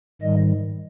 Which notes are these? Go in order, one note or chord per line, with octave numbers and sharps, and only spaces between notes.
G#2 D#3 G3 D#5